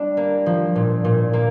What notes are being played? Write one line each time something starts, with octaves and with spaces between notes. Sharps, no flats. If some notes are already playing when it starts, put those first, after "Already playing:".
Already playing: G3 D4
A#3
F3
A#2
A#2
A#3